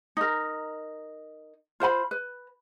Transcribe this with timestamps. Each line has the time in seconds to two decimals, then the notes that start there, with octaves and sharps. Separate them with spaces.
0.17 D#4 A#4
1.80 F4 C5 G5 B5
2.11 B4